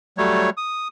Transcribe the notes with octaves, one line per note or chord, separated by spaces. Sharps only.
F#3 G3 A3 C#5
D#6